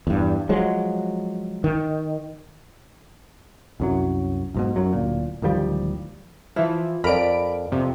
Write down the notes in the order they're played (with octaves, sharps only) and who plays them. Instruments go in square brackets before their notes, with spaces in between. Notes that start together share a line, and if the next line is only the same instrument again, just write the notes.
[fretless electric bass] E2 G2
F3 F#3 G#3
D#3
[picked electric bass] C2 F#2 F#3
B1 G#2 B2
F#2 F#3
D1 A#2
D1 D#3 F3 G3
[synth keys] E3 F3 [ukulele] E4
[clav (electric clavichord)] F2 [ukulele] A#4 D5 [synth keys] B5 D7
[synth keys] F2 C3